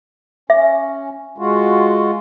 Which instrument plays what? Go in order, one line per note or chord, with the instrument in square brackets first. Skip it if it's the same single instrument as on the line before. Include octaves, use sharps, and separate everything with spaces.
[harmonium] C#4 [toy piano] E5
[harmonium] G#3 F4 F#4